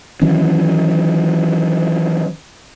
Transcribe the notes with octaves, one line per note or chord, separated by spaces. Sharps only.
D#3 E3 F#3 C#4